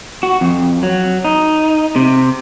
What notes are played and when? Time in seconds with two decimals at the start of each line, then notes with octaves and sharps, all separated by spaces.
0.23 F#4
0.41 F2
0.83 F#3
1.25 D#4
1.96 C3